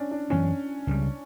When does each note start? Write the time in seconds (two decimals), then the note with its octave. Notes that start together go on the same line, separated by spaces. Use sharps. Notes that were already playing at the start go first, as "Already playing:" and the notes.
Already playing: C#4 D4
0.11 D4
0.30 F#2 E3 B3 C#4 D4
0.87 C#2 C#3 G3